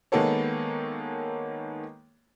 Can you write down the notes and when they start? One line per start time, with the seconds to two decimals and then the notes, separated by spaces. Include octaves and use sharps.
0.12 D#3 G#3 A#3 B3 A4 C#5